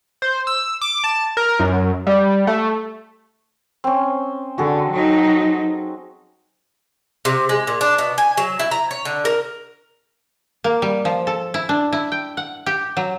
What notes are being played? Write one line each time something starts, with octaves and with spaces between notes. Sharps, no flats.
C5
E6
D6
A5
A#4
F#2
G3
A3
C4 C#4
D3 F#4 G#4 A4
F#3 D#4
C3
G#3
A#2
D4
B2
G#5
F#3
E4
A#5
C#5
D3
A#4
A#3
G3
F3
A4
E4
D4
E4
G5
F#5
G4
F#3